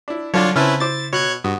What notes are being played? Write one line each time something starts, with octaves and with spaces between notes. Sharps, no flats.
D4 E4
C2 D3 F#3 D4 F4 C#5 A5
C#3 C4 C#4 E4 B4 A5 F6
E4 C5 D6 A6
B2 C#5 F#6 G#6
G2 F#4 D#6